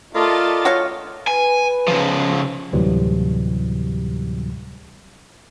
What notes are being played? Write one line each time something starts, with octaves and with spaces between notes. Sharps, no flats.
A3 F4 A#4 D5 D#5 A5 A6
F#4 C#5 F5
B4 G#5
C#3 F3
D2 A2 C3 E3 F#3 G3